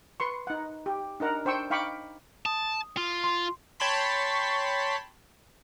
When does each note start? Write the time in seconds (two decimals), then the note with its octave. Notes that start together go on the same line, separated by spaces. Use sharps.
0.20 B4 C6 C#6
0.47 D#4 F#5
0.86 G4
1.20 D4 D#4 A#4 F#5 A#5
1.45 D4 C5 G5 C#6 E6
1.70 D#4 F5 G5 B5 C#6 D6
2.46 A5 D#6
2.97 F4
3.24 C6
3.80 C#5 G5 A5 B5 C6 B6